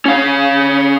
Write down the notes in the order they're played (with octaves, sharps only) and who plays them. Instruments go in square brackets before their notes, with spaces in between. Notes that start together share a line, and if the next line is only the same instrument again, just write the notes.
[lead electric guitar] C#4 F5